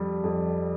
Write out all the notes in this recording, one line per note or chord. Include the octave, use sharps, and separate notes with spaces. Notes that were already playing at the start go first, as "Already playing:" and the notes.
Already playing: F2 G3
F2